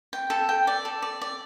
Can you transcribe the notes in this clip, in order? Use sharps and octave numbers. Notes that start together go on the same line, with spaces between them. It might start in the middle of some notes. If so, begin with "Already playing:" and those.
G5
A4
G5
D5
A4
D5
D5